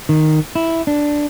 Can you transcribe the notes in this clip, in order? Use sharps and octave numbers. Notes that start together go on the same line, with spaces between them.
D#3
E4
D4